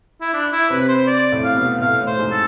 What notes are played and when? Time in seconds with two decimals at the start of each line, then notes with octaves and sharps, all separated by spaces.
0.21 E4
0.34 D4
0.52 E4
0.70 C3 C4 B4
0.89 C5
1.07 D5
1.32 A2 A3
1.44 F5
1.57 B2 B3
1.81 A2 A3 F5
2.00 A2 A3
2.07 C5
2.19 G#2 G#3
2.31 A4